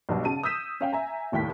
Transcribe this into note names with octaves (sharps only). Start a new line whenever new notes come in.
B1 G2 B2
C#3 A5 D#7
D#6 E6 G6 B6 D#7 E7
C#4 F5 G5
E5 G#5 A#5
F1 D#2 A2 G5 B6